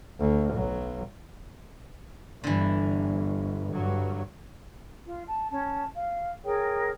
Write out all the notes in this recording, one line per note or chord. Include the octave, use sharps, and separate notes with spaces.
D2
B1 F#3
G1 D3 E3
G2 F#3
F4
A5
C#4 A5
F5
G#4 A#4 C#5 G5